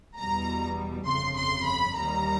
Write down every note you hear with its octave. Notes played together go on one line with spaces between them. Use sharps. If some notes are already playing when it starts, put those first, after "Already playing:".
E2 B2 G3 A#5
G1 F2 C#3 C6
C6
B5
D#2 D#3 G3 A#5